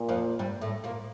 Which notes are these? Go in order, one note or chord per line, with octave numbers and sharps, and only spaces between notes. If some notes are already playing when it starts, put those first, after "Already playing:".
Already playing: A#2
F2 F3
G2 G3
A2 A3
A#2 A#3